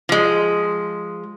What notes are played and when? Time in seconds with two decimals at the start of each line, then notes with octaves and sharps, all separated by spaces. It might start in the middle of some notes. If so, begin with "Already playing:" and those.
0.09 F3 G#3